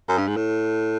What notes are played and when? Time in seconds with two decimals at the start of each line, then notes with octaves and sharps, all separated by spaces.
0.08 F#2
0.18 G2
0.28 G#2
0.37 A2